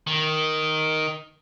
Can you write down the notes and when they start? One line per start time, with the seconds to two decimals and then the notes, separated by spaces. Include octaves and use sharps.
0.07 D#3